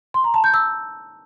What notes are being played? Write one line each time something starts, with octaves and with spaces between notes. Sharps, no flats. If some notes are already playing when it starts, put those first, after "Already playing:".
C6
A#5
A5
G6
E6